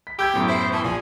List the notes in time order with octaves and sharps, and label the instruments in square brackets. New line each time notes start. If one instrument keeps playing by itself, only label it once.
[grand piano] B6
[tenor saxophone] G4 [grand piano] E6 G6 G#6
[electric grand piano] F#2 A2 B3
[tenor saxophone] E4 [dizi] C5
[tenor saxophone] E3 [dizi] A5
[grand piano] A#1 [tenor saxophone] F3 [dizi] G#5